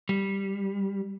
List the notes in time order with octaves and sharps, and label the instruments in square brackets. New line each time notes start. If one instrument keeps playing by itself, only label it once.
[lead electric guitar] G3